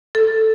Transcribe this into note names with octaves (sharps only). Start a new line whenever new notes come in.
A4